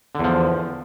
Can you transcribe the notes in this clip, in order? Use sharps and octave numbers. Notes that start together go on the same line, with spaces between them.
E2 D3 F3